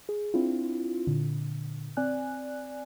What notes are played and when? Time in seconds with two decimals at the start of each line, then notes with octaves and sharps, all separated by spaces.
0.09 G#4
0.34 C4 D4 E4 F4
1.07 A#2 D3
1.97 C4 D5 G#5 F#6